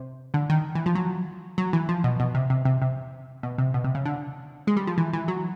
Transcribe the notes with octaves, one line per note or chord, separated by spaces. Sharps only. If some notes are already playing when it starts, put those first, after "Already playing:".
Already playing: C3
D3
D#3
E3
F3
F#3
F#3
E3
F3
B2
B2
C3
C3
C3
C3
B2
C3
B2
C3
C#3
D3
G#3
G3
F3
E3
E3
F#3